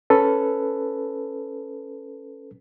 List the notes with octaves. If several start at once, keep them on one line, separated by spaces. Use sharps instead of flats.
C#4 A4 B4